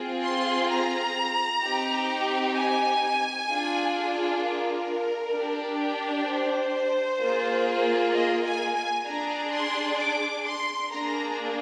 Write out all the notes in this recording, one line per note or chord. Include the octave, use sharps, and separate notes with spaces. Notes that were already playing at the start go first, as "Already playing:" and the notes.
Already playing: C4 F4 G#4
C6
A#5
C4 D#4 G4
G#5
D4 F4 G#4
A#4
D4 G4
C5
A#3 F4 G#4
D#5
G#5
G#5
D4 G#4 A#5
C6
D6
C6
A#3 D4 G#4 A#5